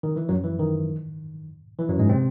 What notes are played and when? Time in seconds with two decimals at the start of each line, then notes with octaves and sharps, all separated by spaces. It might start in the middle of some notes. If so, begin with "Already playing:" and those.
0.03 D#3
0.16 E3
0.29 F#2 F#3
0.44 E3
0.59 D#3
1.79 E3
1.89 F#2 F#3
1.99 G#2 G#3
2.09 C3 C4